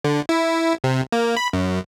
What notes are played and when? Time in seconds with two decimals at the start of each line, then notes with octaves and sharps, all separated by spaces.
0.04 D3
0.29 E4
0.84 C3
1.12 A#3
1.37 B5
1.53 F#2